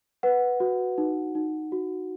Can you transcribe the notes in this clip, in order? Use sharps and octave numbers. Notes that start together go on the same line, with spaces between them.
B4 F#5
F#4
D#4
D#4
F#4